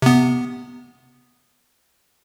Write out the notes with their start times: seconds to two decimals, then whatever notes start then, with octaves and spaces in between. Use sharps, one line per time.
0.02 C3 B3